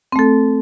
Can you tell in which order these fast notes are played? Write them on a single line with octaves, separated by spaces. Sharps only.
C4 A3 A4